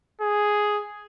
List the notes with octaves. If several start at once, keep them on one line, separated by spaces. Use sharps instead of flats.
G#4